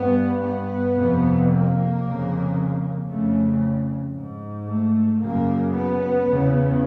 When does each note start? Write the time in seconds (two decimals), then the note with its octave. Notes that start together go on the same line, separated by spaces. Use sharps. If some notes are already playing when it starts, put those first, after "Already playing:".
Already playing: G2 B3
0.43 B3
0.96 F2 C3
1.49 A#3
2.02 F2 C#3
3.08 F2 C#3 A3
4.14 G#2
4.68 A3
5.21 F#2 C#3 A#3
5.74 B3
6.27 E2 C#3